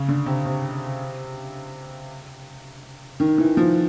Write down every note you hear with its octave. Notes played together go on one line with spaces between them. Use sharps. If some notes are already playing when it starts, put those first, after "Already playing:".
Already playing: C#3
D3
C3
C3
D#3
E3
F3